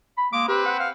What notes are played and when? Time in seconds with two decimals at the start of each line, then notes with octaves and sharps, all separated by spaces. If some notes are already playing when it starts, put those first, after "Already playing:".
0.17 B5
0.33 G#3 A#3 D6
0.48 C4 G4 B4
0.66 F#5
0.80 F5